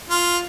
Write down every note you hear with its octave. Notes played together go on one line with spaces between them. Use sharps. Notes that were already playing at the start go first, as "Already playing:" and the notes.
F4